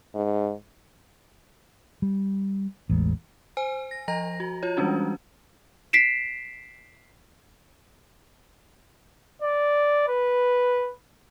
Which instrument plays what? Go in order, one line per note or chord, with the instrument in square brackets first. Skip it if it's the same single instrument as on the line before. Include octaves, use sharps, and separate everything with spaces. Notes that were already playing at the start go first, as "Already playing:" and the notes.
[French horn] G#2
[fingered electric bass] G3
A1 E2 G#3
[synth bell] C5 G#5
A#6
F3 D#5 A#5 A#6
F#4
F4 C#5
E3 G3 G#3 C#4 D4 F#4
[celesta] B6 C7 D7 E7
[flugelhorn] D5
B4